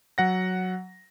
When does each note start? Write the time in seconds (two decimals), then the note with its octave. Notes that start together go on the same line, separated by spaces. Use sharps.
0.18 F#3 F#5 A#6